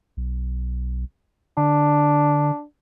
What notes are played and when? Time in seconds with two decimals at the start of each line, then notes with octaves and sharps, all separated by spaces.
0.17 B1
1.57 D3 D4